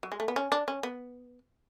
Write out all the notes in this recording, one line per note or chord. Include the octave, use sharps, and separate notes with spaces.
F#3
G#3
A3
B3
C#4
D4
C#4
B3